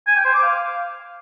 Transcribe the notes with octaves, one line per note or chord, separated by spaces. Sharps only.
G#5
G5
C5
D6
F5